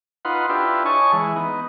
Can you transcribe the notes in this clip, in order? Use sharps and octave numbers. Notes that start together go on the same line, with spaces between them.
D#4 F4 B4 F#5 C6
D4 E4 F4 G4 B4
C#5 D#5 G#5 A5 C#6
E3 G#3
B3 D#4